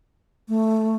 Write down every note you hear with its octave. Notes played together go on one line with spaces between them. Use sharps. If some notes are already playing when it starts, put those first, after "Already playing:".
A3